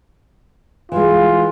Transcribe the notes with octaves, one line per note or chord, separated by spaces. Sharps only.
E3 G#3 F4